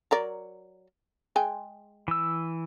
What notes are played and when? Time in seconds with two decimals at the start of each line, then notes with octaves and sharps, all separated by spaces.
0.11 F#3 A#4 D5
1.36 G#3 G5 G#5
2.08 E3 E6